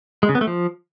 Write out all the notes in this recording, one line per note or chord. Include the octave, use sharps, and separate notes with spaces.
G#3
C#3
B3
A3
F3